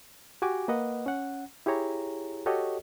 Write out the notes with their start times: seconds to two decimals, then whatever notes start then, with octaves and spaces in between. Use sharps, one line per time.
0.42 F#4 G4 G#5 D6
0.68 A#3 B4 D#5 F#5
1.06 C#4 F#5
1.66 E4 G4 G#4 C#5 A#5
2.46 F#4 G4 A4 C#5 D#5